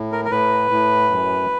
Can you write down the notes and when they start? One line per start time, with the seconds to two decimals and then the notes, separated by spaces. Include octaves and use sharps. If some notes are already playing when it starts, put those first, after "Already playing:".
Already playing: A2
0.12 A#4
0.25 A#4
0.31 A2 B4
0.71 A2
1.11 F#2